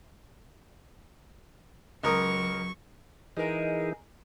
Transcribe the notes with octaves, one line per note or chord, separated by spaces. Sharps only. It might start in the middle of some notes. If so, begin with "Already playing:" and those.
C#2 F#3 A#4 C#6 D#6
E3 G#3 D#4 A#4